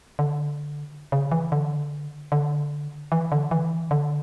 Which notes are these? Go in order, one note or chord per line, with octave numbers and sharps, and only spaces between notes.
D3
C#3
E3
D3
D3
E3
D3
E3
D3